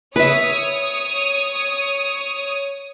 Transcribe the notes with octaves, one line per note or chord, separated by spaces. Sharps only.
B4 C#5 E5 D#6